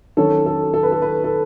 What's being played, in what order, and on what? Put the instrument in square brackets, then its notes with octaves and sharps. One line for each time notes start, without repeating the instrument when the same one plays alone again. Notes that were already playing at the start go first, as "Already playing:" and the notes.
[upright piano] D#3 F#3 C#4 F#4 C#5 [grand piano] A4
[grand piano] A4
A4
B4
A4
B4
A4